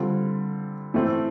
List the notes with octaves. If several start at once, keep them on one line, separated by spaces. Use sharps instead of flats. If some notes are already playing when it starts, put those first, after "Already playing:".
Already playing: D3 G3 C4 F4
A2 E3 A3 C4